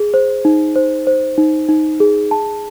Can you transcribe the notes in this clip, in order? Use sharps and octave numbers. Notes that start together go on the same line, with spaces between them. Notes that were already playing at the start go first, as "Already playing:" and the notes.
Already playing: G#4
C5
D#4
C5
C5
D#4
D#4
G#4
A5